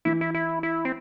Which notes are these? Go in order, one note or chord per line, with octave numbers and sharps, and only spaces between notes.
E3 E4
E4
E4
E4
C4